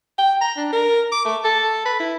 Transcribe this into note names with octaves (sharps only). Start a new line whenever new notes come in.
G5
A#5
D4
A#4
D6
A3
A4
B4
E4